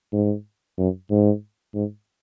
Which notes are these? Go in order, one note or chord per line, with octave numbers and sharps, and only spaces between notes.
G#2
F#2
G#2
G#2